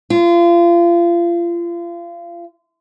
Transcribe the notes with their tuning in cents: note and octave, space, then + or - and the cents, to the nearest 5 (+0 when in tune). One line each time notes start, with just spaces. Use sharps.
F4 -30